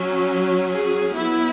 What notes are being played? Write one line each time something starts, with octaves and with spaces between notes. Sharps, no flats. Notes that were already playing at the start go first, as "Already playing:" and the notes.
Already playing: F#3 C#4
G#4
F#3 B3 E4